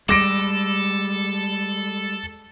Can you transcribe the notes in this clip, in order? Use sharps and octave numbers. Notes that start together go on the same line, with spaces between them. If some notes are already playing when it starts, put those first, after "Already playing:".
G3 G#3 A4 D6 A#6 D7